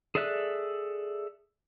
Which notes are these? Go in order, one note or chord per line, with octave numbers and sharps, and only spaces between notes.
G#4 A4 D5 E5 F#6